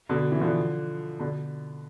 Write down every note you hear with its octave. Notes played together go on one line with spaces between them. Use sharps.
B2 D3
E3
D3 F3
B2 D3